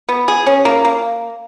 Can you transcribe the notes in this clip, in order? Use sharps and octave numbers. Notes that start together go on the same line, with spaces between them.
B3
G#4
C#4
A#3
A#3